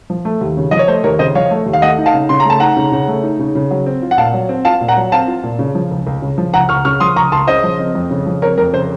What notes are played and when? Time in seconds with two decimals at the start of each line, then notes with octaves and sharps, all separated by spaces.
0.10 F3
0.25 A3
0.41 D#2
0.57 C#3
0.71 F3 D#5
0.79 C#5
0.88 A3 C5
1.04 D#2 A#4 C#5
1.19 C#3 C5 D#5
1.35 F3 C#5 F5
1.51 A3
1.66 D#2
1.73 F5
1.82 A3 D#5 F#5
1.98 D#4
2.06 F5 A5
2.14 C#3
2.29 C#3 C6
2.40 A#5
2.45 A3 A5
2.60 D#4 F#5 A#5
2.77 C#3
2.92 C#3
3.08 A3
3.23 D#4
3.39 C#3
3.55 C#3
3.71 F#3
3.86 C4
4.02 F4
4.11 F#5
4.18 A#2 F5 A5
4.34 F#3
4.49 C4
4.65 F4 F5 A5
4.81 A#2
4.88 F#5 A#5
4.96 F#3
5.12 C4 F5 A5
5.28 F4
5.43 A#2
5.59 C#3
5.75 F3
5.91 C#2
6.07 C#2
6.22 C#3
6.38 F3
6.53 C#2 F#5 A#5
6.69 C#2 C#6 F6
6.85 C#3 C#6 F6
7.00 F3 C6 D#6
7.16 C#2 A#5 C#6
7.32 C#2 A5 C6
7.47 C#3 C5 D#5
7.63 F3
7.79 C4
7.95 F2
8.11 C#3
8.26 F3
8.42 C4 A#4 C#5
8.58 F2 A#4
8.73 C#3 C5